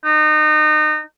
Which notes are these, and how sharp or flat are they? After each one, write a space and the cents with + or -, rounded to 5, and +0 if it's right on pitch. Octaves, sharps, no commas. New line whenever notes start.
D#4 -30